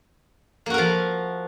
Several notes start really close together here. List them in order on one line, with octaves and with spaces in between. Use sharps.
A#3 F#4 A#4 F3